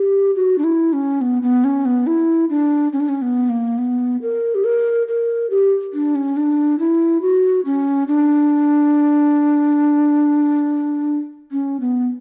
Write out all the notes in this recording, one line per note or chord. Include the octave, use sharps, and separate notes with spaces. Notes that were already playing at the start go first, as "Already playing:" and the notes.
Already playing: G4
F#4
D4
E4
C#4
B3
B3
C#4
B3
E4
D4
C#4
D4
C#4
B3
A#3
B3
A#4
G4
A#4
A#4
G4
D4
C#4
D4
E4
F#4
C#4
D4
C#4
B3